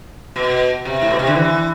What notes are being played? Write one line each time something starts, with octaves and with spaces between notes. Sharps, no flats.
B2
C3
A2
B2
C3
D3
E3